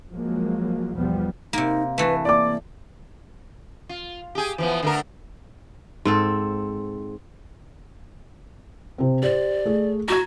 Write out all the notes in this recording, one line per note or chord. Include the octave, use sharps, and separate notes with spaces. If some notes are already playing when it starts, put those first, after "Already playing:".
F3 F#3 G#3 A#3
B1 E2 F3 G3 B3
C3 A#3 D#4
E3 A3 B4
A#3 D5 D6
F4
G4 G#4
E3 F3 B3
D3 A3 A#4
G#2 C4 A4
C3 C4
G4 C5 D5
A3 G#4
F#4 A#5 G#6